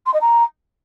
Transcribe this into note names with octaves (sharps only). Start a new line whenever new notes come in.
C6
D#5
A#5